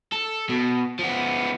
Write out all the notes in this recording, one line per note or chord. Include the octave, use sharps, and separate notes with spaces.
A4
B2
F3 B3